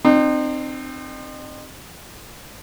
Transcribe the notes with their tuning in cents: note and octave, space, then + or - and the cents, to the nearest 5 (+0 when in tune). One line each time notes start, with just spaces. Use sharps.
C4 +0 D#4 -40